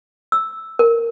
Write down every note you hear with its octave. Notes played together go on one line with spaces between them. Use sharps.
E6
A#4